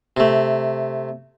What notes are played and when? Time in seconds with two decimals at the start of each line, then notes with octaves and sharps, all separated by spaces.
0.17 C3 A3